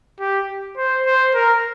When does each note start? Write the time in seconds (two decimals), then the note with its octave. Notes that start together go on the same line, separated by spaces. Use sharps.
0.20 G4
0.77 C5
1.05 C5
1.35 A#4